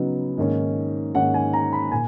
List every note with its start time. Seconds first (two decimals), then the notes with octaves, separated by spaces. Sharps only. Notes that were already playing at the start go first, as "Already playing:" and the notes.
Already playing: C#3 F#3 B3 D#4
0.38 G#2 D#3 A#3 C#4
1.15 G#2 D#3 A#3 C#4 F#5
1.34 G#5
1.53 A#5
1.73 B5
1.92 A#2 G#5